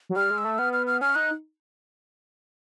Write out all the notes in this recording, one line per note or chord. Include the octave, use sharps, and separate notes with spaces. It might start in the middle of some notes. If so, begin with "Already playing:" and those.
F#3
G3 F6
G#3
E6
A3
B3 F6
F6
F6
C#4 F6
D#4 F#6